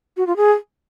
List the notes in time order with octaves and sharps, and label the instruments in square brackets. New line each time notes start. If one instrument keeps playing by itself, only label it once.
[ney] F#4
F4
G#4